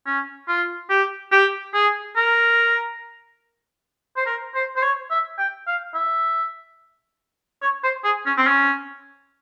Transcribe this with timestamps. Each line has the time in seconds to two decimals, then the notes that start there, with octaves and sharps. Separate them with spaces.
0.07 C#4
0.48 F4
0.90 G4
1.32 G4
1.74 G#4
2.16 A#4
4.17 C5
4.27 A#4
4.55 C5
4.76 C5
4.83 C#5
5.11 E5
5.39 G5
5.67 F5
5.94 E5
7.62 C#5
7.83 C5
8.04 G#4
8.26 C#4
8.38 C4
8.47 C#4